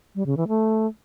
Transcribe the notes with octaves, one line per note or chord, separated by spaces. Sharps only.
G3
C#3
E3
A3